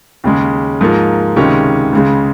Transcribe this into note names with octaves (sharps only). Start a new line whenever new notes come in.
D#2 C#3 G#3 C#4
G#2 F3 A#3 F4 A#4
C#2 C3 D#3 G#3 C#4
C#2 C#3 G#3